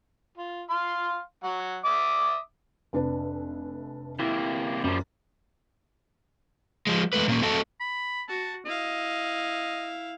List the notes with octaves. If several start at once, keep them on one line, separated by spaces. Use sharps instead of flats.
F4
F5 C6
F#3 F#5
E5 D6 D#6
F1 D4 B4
C3 A#3 E4
F#2 F3 G3
F3 G#3
E2 G#3 A3 B4
A#2 A#3 C#4
A3 C4 F#4 A4 D#5 A5
B5
F#4 A5
E4 D#5 F5